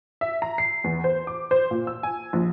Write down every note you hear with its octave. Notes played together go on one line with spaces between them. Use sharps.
E5
A#5
C7
E2
C5
D6
C5
A#2
E6
G#5
A#1